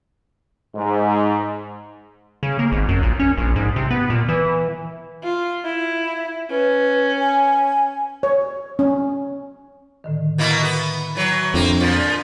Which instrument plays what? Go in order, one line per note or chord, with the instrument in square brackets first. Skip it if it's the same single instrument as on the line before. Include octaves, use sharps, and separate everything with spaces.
[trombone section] G#2
[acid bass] C#3
A#3
G#1
F#2
A#1
C#4
A#1
G#2
C3
B3
A#2
E3
[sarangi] F4
E4
[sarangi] C#4 [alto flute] B4
[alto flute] G#5
[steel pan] C#5
C#4
[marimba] A2 D3 D#3
[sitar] B2 A#3 E4
B3
E3 F#3
[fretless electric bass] F2 [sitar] A#3 C4 [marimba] D4
[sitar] A#2 F3